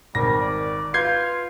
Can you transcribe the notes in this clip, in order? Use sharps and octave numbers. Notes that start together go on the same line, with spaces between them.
G#1 G3 A#4 A#6
D5
F4 B4 G6 G#6 C7